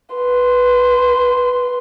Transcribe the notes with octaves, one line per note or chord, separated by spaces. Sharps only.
B4 C6